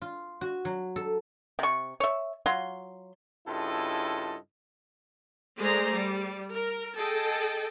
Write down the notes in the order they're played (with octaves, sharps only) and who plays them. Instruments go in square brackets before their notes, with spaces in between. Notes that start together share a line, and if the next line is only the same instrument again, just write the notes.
[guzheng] F4
F#4
F#3
A4
[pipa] C3 C#6
C#5 E5
F#3 F4 C6
[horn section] G2 C#3 E4 F4 A4 D#5
[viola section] G#3 A3 G#4 C5 D5 A#5
G3
A#4
G#4 A4 D#5 G5 A5